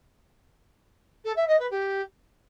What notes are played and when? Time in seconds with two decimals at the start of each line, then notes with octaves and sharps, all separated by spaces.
1.25 A4
1.36 E5
1.48 D#5
1.59 B4
1.71 G4